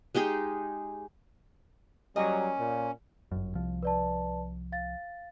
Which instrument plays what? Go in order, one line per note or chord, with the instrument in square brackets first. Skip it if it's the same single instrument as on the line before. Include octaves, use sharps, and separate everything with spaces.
[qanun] G#3 D#4 G4 G#4
[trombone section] F#3 G3 [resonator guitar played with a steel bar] A#3 D#5 [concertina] C#4
[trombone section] A#2
[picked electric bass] G1 F#2
C2 F3
[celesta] B4 D5 A5
F5 A6